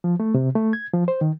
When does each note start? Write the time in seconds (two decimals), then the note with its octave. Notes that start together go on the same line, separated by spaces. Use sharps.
0.04 F3
0.20 A3
0.34 C3
0.56 A3
0.73 G#6
0.94 F3
1.08 C5
1.21 D#3